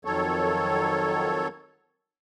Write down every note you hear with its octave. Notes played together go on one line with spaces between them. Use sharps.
F2 D#3 F#3 A4 C#5